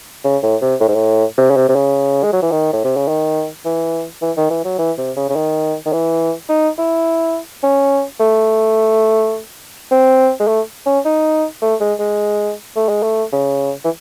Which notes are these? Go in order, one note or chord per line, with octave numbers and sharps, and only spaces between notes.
C#3
A2
C3
A2
G#2
A2
C3
C#3
C3
C3
C#3
G#3
F#3
E3
D#3
A2
C3
C#3
D#3
E3
E3
D#3
E3
F#3
E3
C3
C#3
C#3
D#3
D#3
E3
D#4
E4
C#4
A3
C4
G#3
A3
C#4
D#4
A3
G#3
G#3
A3
G#3
A3
C#3
E3